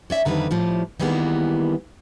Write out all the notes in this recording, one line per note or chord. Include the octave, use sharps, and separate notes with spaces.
C#4 D5 E5
F2 D3 D#3 G3 B4
A2 F3 G3
D#3 E3 G3 G#3 A#3 B3